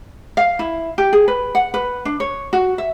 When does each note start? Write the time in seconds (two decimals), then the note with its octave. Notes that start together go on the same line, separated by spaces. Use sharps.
0.37 F5
0.59 E4
0.98 G4
1.13 G#4
1.28 B4
1.55 F#5
1.74 B4
2.05 D4
2.20 C#5
2.53 F#4
2.78 E5